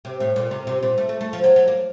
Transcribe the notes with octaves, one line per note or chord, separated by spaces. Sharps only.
C3
A2
A#2
C3
C3
A#2
A3
A3
A3
F3
F#3
F#3
A#3